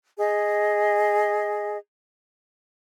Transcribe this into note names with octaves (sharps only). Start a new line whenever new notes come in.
G#4 D#5